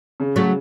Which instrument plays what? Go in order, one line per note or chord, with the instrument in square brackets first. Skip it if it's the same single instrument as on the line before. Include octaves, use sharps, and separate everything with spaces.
[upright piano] C#3
[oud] F#3 A3